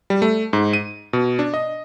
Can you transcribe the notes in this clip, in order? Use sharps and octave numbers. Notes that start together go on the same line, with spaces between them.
G3
A3
G#2
D#7
B2
D4
D#5